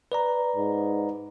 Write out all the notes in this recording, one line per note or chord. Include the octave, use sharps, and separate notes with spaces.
B4 D5 A#5
G#2